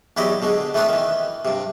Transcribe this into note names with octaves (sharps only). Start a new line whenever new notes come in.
E2 F#3 E4 G4 D5 D#5
B2 D3 G#3
E3 A3 B3 C4 D4
D#3 E3
G2 C3